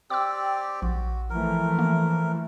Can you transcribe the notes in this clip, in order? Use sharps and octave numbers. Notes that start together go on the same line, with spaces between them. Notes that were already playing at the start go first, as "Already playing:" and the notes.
C4 G4 D5 D6 E6
A#1 F#4
E3 F3 A3 A#4
A#3